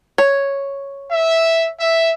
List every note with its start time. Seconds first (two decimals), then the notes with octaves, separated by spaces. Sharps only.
0.18 C#5
1.10 E5
1.79 E5